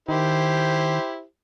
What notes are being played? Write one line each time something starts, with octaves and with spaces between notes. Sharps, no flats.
D#3 E4 G4 C5